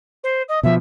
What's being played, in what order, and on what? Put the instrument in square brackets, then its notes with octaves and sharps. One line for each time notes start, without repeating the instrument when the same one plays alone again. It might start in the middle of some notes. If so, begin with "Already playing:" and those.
[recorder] C5
D#5
[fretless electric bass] B2 F3 [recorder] E5